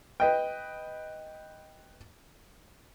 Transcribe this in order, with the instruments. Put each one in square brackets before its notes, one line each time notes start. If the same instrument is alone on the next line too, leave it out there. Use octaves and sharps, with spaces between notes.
[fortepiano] B4 D#5 G5